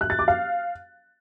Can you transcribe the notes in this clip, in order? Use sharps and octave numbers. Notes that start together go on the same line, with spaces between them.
F#6
A6
D6
F5